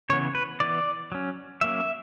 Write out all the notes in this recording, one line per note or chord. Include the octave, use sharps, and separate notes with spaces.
C#3 E3 B3 C#5
B4
E3 B3 D5
F#3 C#4
F#3 A#3 C#4 E5